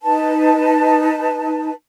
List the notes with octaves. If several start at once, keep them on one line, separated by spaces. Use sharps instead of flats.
D#4 B4 A5